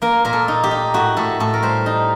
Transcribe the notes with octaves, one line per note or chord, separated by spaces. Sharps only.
A#3 A#4
A#2 A#4
A4
D#4
G4
D#4
A2 F#4
A2 A4
A2 A4
A#4
G3 C5
D#4